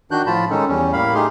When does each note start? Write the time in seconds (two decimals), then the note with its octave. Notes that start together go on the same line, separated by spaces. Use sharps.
0.11 D#3 D4 F#4 F#6 G6
0.26 A2 F3 F4 A5 B5
0.50 D#3 G#3 C#4 D#4 A4
0.69 E2 G3 C#4
0.93 A2 G3 A#3 F5 B5
1.14 A3 D#4 G4 G#4 C6